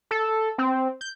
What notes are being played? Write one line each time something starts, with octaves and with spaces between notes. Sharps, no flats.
A4
C4
G6